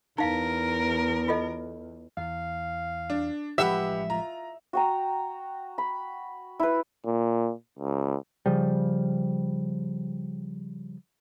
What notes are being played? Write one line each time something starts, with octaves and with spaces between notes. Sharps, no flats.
E2 D#4 A#4 F5
F4 A4 D#5
E2 F5
D4
A1 F3 G#3 G4 B4 E5 F#5 B5
F4 A#5
F#4 G5 A#5
B5
E4 B4
A#2
C#2
C#3 F3 G3